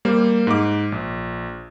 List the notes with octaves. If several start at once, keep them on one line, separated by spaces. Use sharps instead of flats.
G3 A#3 C5
G#2 D6
A#1